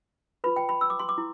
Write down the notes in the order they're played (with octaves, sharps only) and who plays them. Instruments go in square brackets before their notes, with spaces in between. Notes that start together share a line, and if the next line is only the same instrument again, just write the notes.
[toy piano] F4 B4 B5
G5
B5
E6
D6
C6
D6
E4